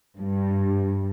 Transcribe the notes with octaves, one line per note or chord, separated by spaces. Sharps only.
G2